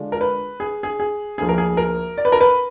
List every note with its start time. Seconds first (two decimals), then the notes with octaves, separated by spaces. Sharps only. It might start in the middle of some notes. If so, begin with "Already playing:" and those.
Already playing: D3 G#3 D4 F4
0.12 A#4
0.21 B4
0.60 G#4
0.83 G#4
1.00 G#4
1.38 D2 D3 F3 A#3 G#4
1.49 A#4
1.58 G#4
1.77 A#4
2.18 D5
2.25 B4
2.32 A#4
2.41 B4